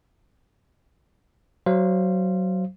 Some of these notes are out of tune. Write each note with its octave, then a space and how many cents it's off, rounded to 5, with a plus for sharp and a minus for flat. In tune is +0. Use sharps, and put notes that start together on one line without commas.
F#3 +15 C5 +0 F5 -20